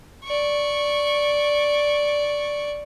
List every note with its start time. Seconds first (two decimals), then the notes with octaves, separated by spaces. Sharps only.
0.25 D5 C#6